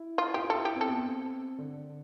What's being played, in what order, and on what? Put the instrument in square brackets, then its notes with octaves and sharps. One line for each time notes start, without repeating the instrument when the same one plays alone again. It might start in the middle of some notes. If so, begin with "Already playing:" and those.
Already playing: [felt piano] E4
[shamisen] F4
[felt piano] F4 [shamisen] G4
[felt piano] E4 [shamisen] A4
[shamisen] G4
[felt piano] C4
[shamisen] A4
[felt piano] B3
C4
D3